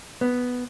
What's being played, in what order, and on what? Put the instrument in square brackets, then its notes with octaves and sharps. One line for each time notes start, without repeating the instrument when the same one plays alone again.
[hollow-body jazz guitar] B3